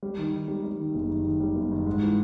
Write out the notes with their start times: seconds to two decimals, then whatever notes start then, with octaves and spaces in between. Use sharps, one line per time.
0.03 G3
0.18 D#3
0.34 D#3
0.48 G3
0.64 G3
0.79 D#3
0.95 F#1
1.10 D#3
1.25 D#3
1.40 G3
1.56 F#1
1.71 D#3
1.87 G#2
2.02 E3